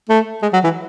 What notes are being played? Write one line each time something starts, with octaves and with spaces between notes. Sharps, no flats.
A3
G#3
F#3
E3